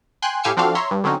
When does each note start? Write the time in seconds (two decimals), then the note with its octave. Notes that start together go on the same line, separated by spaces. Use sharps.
0.22 G5 G#5 C6 F#6
0.43 A2 G4 F5 G#5 E6 C#7
0.57 F3 C4 D4 F#4 A4 F5
0.75 C#5 E5 A#5 C6
0.91 G2
1.04 D3 F#3 C4 C#4 D#4